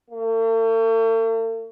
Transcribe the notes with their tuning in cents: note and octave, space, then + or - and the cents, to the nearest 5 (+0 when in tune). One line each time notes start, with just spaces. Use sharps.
A3 +45